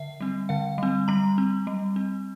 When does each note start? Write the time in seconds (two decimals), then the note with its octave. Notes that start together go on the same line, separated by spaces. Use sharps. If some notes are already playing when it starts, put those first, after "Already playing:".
Already playing: D3 E5
0.21 G3 C4
0.49 D3 F5
0.78 G3 C4
1.08 G3 A#5
1.38 C4
1.67 G3
1.96 C4